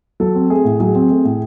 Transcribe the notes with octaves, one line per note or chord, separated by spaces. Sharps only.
F#3 A4
C4
A3 G#4
A2
F#3 G#4
C4
A3
A2